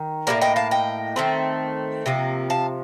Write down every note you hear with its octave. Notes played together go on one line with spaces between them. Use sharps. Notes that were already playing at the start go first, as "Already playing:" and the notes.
Already playing: D#3
A2 F3 A#3 A#4 D5
D#5 G5
F5 A5
D#5 G5
D#3 A3 C4
C3 F3 A#3
F5 A5